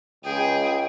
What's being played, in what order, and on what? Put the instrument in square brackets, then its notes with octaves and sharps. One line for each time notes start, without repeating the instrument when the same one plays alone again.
[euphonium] C#2 [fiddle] G#4 [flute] G5